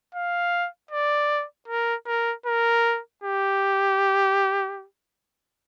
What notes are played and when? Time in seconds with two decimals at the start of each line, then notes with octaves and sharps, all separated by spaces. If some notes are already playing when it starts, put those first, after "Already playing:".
0.15 F5
0.91 D5
1.68 A#4
2.07 A#4
2.46 A#4
3.24 G4